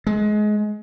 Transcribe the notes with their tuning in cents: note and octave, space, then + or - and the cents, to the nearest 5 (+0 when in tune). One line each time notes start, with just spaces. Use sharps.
G#3 +25